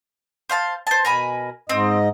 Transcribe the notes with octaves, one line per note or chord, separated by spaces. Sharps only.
C5 F5 A5
C5 A5
B2 A#4 G#5 B5
G#2 C4 D#5